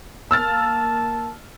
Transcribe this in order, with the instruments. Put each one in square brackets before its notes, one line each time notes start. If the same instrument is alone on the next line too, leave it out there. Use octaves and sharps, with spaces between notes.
[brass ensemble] A#3 A5 [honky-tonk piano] E6 F6 A6